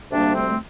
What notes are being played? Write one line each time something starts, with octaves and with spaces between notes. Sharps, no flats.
D2 C3 G3 A#3 D4
A3 C4
A3